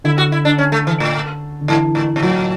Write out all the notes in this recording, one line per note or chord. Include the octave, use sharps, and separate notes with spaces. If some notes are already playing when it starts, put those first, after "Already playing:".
D3 E4
F#4
E4
D4
C#4
A3
E3
A2
D3
G#2 E3
A2
B2
A2 F#3